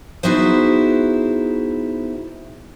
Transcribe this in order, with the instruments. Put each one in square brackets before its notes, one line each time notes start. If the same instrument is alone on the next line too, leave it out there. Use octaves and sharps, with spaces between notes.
[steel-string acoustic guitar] B3 D#4 E4 F#4 G#4 C5